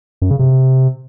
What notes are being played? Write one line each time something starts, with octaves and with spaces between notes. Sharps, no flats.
F#2
C#3
C3